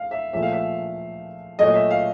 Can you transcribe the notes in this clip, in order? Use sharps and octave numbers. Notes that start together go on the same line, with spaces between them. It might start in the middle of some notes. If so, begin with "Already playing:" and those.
Already playing: F5
E5
A#2 F3 A3 E5
F5
E5
A#2 F#3 A3 D#5
E5
F5